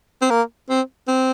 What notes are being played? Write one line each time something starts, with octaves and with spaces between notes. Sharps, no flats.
C4
A#3
C4
C4